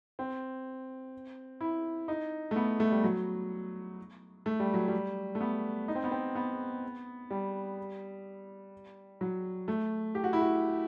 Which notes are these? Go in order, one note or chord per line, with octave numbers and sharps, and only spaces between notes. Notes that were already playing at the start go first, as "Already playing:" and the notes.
C4
E4
D#4
A3
B3
A3
G3
F#3
A3
G3
F#3
G3
A3
B3
D#4
C4
B3
C4
B3
G3
F#3
A3
G4
F#4
E4
F#4